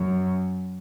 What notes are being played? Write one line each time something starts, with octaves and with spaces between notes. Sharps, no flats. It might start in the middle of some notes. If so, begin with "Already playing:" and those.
Already playing: F#2